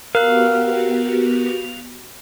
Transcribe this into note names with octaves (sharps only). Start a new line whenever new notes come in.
B3 F#4 G4 A#4 F5 F#6